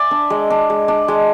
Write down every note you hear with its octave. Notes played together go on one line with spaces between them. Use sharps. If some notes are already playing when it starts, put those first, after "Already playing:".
Already playing: D5 E5 G#5
D4
G#3
D4
G#3
D4
G#3